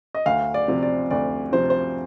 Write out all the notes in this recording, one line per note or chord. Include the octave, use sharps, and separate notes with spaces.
D#5
D2 F5
D5
C3 F3
D5
D2 D5
C3 F3 C5
C5